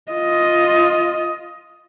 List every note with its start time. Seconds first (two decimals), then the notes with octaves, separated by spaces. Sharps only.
0.12 F4 D#5